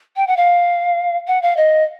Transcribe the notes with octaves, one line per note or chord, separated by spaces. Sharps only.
G5
F#5
F5
F#5
F5
D#5